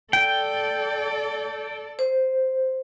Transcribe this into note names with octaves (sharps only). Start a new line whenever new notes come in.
A4 D5 G5
C5